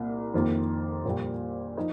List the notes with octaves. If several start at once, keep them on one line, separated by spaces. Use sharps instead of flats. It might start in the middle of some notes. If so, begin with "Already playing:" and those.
Already playing: C2 A#2 A#3
F2 D#3 A#3 F4
A#1 A#2 G3
F3 D#4